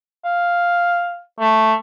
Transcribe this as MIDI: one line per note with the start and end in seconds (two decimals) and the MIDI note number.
0.25 1.20 77
1.40 1.73 57